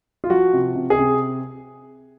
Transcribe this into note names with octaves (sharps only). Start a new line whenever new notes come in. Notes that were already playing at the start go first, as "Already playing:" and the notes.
F4
F3 F#4
C3
C3
G#4
C3